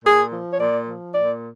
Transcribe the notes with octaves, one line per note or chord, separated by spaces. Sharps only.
A#2 G#4
F3
C#5
A#2 D5
F3
A#2 D5